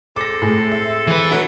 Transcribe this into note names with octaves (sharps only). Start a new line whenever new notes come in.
G#3 C4 A4 D6 A#6
A2 G#4
E5
E3 B4
D3 F#3 E4